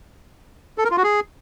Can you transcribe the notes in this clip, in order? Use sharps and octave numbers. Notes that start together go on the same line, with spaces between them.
A4
A#4
F4
F#4
G#4